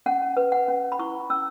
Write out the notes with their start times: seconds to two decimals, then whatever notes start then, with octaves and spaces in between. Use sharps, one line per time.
0.06 C#4 F#5
0.37 B4
0.52 F#5
0.68 C#4
0.92 B5
0.99 E4 C#6
1.30 C#4 E6